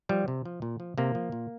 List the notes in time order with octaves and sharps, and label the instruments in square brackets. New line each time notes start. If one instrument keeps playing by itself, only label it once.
[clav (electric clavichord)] F3 G3
C3
F3
A#2
F3
C3 A#3
F3
A#2